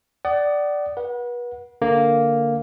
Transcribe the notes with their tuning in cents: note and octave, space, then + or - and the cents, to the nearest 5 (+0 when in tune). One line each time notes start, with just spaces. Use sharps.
D5 +0 F#5 +35 D#6 -15
B4 -35 F#5 -15
D3 +0 A#3 +0